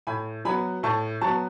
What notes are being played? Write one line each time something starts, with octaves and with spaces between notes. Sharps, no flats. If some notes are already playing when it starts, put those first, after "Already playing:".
A2 G#5 B5
F#3 B3 G#5 B5
A2 A5 C#6
F#3 A5 C#6
B3